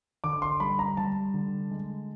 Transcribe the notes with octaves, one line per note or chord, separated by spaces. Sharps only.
D3 D6
C6
G3 B5
A#5
G3 A5
D3
G#3